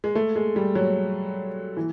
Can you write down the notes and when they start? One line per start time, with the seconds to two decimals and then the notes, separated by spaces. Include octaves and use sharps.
0.04 G#3
0.15 A3
0.36 G#3
0.56 G3
0.75 F#3
1.77 E3